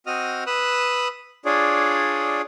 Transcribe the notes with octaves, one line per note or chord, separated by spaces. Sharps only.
C4 F#4 D#5 D#6 F6
B4 D#6 E6 F#6
D4 F4 G#4 C#5 D5